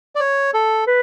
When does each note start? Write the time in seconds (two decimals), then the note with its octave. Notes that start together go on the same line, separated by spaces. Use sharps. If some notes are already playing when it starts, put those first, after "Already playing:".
0.15 D5
0.20 C#5
0.54 A4
0.87 B4